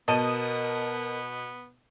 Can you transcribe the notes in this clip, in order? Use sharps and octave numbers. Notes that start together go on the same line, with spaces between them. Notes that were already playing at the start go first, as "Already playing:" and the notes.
B2 B3 A#4 D#5 A5 D#7